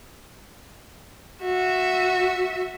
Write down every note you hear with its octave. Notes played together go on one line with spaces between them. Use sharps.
F#4 E5